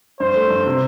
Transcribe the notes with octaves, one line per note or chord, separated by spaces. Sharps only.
G2 C5
A3
G2
C3